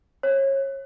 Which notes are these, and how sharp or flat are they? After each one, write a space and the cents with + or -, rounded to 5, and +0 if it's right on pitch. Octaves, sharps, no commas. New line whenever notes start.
C#5 -30